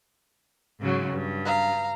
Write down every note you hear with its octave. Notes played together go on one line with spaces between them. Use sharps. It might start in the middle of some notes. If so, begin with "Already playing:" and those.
G#2 C#3 F#3
G2
F5 A#5